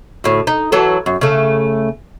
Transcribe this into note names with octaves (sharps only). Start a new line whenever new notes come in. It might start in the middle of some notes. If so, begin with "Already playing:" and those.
D2 A2
D#4
E3 F#3 A4
F#2
C#3 A3